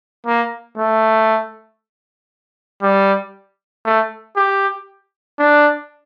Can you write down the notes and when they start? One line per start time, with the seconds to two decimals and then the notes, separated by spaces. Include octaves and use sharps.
0.27 A#3
0.78 A3
2.82 G3
3.85 A3
4.36 G4
5.39 D4